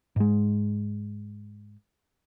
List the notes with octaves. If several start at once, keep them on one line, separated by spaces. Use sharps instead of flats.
G#2 G#3